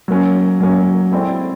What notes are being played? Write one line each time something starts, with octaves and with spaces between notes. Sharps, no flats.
F#3 A#3 C#4
F#3 A#3 C#4
G#3 C4 E4 A4 D5